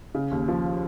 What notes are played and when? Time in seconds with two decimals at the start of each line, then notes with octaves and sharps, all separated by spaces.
0.15 C#3
0.31 D#2
0.48 F3